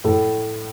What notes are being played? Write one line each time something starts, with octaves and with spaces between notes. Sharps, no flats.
A2 A3